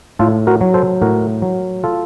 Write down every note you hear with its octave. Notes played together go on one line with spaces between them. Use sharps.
A2 F4 A4
F#4 A#4
F#3
A4 C5
A2 F#4 A#4
F#3
F4 A4